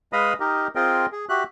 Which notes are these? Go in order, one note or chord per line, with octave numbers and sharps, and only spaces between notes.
G#3 B4 D#5 F5 B5 D#6
D#4 G4 A#4 D#5
C4 F4 G#4 A#4 D#5 G5
G#4
F#4 G4 E5 F#6